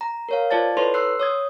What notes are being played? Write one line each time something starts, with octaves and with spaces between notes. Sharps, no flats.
A#5
A#4 C#5 F5
F4 C5 D5 A5 A6
E4 A4 B4 C#5 C6
C6 E6 F#6 C7
C#5 D#6 G#6